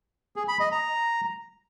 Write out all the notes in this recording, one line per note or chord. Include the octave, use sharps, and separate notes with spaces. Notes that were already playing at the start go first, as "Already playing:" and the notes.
G#4
B5
D#5
A#5